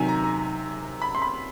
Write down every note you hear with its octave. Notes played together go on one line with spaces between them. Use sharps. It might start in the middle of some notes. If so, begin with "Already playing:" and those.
Already playing: C3 D#3 F#3 G#5
A#5
A#5
B5
C6
B5